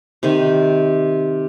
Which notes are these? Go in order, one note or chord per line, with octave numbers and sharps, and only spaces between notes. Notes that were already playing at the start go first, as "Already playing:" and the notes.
C3 D#3